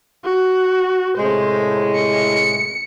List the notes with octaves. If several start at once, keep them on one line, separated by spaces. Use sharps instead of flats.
F#4
A2 C3 G#3 C5
C#7